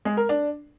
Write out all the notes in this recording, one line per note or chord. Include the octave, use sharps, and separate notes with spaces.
G#3
A#4
D4